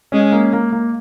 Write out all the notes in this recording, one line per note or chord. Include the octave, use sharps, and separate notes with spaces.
G#3 C#4
A#3
A#3
A#3